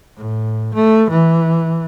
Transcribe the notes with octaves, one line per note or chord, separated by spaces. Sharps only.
A2
A3
E3